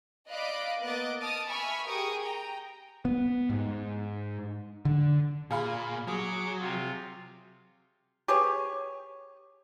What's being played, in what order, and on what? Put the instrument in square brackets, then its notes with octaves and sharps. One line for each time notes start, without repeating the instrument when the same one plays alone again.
[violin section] D5 D#5 F5 B5 D6 F#6
A#3 B3 D#5 D6 F#6 A6
A5 D6 D#6 F6 A6
E5 G#5 B5 C#6 E6 F6
G4 G#4 A#4 C#6 D#6 D7
G5 A#5
[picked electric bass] B3
G#2
D3
[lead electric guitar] A#2 [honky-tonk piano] G#4 F5 B5
[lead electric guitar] F#3 [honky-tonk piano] G#4 D#6 [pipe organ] C#5 D6
[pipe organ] C3 F4
[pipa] G4 G#4 B4 C#5